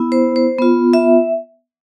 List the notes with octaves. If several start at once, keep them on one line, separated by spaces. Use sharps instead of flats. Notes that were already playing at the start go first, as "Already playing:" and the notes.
Already playing: B3 E4
C5
C5
B3 F4
E5